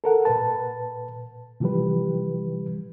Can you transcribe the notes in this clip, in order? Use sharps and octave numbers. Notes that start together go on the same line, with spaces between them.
A4 A#4 F#5
A#2 B4 A5
C3 E3 F3 G3 G4 B4